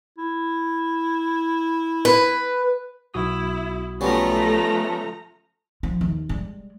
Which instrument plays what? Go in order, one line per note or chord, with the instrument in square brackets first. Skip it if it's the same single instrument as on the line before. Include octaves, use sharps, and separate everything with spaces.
[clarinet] E4
[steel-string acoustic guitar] B4
[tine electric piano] B1 F#4 D#6 [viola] E4
[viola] F3 A#5 [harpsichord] G3 B3 C#4 [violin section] A3
[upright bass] F3
D#2
G3 G#3